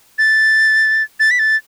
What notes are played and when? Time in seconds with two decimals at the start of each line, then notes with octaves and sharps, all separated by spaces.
0.19 A6
1.20 A6
1.31 B6
1.39 A6